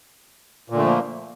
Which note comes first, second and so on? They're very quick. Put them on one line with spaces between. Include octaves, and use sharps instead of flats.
A#2 D3 A3 F3 A#3